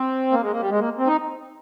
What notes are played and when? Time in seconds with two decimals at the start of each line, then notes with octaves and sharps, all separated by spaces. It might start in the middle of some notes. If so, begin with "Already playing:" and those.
Already playing: C4
0.32 A#3
0.42 G#3
0.51 A#3
0.60 G3
0.70 G#3
0.80 A#3
0.98 C4
1.07 D#4